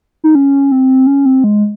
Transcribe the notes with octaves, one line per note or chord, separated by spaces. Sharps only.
D#4
C#4
C4
C#4
C4
G#3